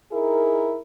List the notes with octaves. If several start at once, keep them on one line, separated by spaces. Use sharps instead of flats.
D#4 E4 G#4 A#4